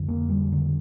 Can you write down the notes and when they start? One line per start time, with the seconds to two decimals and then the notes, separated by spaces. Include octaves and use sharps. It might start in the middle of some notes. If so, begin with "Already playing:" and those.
Already playing: F2 D3
0.08 A#3
0.29 G3
0.52 D3